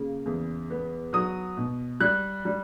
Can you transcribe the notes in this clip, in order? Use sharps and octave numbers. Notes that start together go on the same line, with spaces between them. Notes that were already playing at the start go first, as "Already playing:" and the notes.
Already playing: C#3 A#3
E2
B3
F#3 D#6
B2
G3 F#6
G3